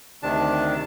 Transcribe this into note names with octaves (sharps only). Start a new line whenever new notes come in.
D2 C3 D#3 D4 A5